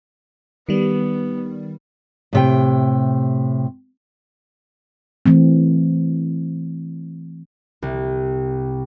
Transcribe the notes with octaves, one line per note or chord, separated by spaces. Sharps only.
D#3 G3 B3
A2 C3 G5
E3 A3 C4
C2